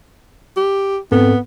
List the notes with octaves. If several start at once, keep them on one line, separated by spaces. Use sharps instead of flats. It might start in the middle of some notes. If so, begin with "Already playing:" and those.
G4
G#2 B3 C4 A4